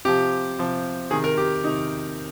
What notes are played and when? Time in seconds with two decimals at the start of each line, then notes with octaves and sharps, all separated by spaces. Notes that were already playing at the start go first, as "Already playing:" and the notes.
0.05 C3 F3 G4
0.59 C3 F3
1.11 C3 D#3 G#4
1.24 A#4
1.37 G4
1.64 C3 D#3 D#4